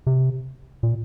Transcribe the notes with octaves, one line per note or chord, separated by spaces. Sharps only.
C3
A#2